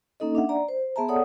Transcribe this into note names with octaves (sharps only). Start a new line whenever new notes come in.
A#3 C#4 D#4 A4 D#5
D4 E5 F#5
D5 A#5
C5
B3 G#4 E5 A5 A#5
A4 C#5 D5 F#5 D#6